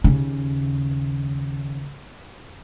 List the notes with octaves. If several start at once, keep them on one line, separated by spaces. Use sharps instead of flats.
D#2 C#3